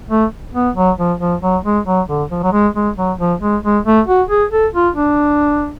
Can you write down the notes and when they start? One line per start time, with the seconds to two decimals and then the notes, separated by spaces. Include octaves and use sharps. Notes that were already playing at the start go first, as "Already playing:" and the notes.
0.10 A3
0.54 B3
0.76 F#3
0.98 F3
1.20 F3
1.42 F#3
1.64 G#3
1.86 F#3
2.08 D3
2.30 F3
2.43 F#3
2.52 G#3
2.75 G#3
2.97 F#3
3.19 F3
3.41 G#3
3.64 G#3
3.85 A3
4.07 F#4
4.29 G#4
4.52 A4
4.74 F4
4.95 D4